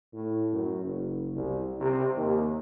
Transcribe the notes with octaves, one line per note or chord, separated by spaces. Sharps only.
A2
F#2
F#1
C2
C3
D#2